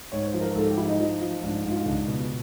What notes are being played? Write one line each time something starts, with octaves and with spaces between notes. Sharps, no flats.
G#2 C#5
C5
F3
A#4
G#2 A4
G4
F3 E4
D#4
F3
F3
G#2 D4
G#2
F4
C#2 D4
B2